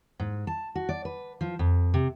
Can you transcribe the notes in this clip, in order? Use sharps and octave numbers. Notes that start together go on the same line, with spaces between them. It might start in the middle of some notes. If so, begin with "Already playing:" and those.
G#2
A5
F#4
D5
B4
F3
F2
C3